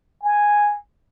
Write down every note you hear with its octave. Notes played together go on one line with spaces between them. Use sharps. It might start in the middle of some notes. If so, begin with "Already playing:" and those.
G#5